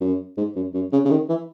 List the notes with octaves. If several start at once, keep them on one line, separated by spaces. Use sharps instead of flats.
F#2
G#2
F#2
F#2
C#3
C#3
D#3
E3